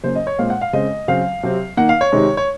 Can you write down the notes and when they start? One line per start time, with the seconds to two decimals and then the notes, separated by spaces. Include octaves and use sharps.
0.04 C#3 F#3 A#3 C5
0.15 D#5
0.27 C#5
0.39 A#2 G#3 C4 F5
0.50 F#5
0.61 F5
0.73 C#3 G#3 C4 D#5
1.08 C#3 F#3 C4 F5
1.43 C3 F#3 C4
1.77 D#3 A#3 F#5
1.89 F5
2.01 C#5
2.12 C3 D#3 G#3
2.37 C#5